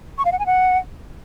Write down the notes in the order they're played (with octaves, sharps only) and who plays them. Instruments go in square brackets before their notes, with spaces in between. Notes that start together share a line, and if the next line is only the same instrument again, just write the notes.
[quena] C#6
F5
F#5
G#5
F#5